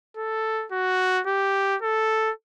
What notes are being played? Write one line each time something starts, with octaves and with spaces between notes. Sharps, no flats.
A4
F#4
G4
A4